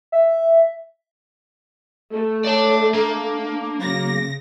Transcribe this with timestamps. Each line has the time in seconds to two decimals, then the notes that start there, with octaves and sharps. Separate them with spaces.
0.12 E5
2.13 A3 A4
2.45 C#5 D5 A5
2.94 A#3 D4
3.81 C#3 F#3 A#6